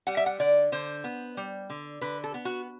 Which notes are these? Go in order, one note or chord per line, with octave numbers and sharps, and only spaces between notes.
G3 F#5
E5
F#5
D3 D5
D3 C5
B3
G3
D3
D3 B4
A4
B3
F#4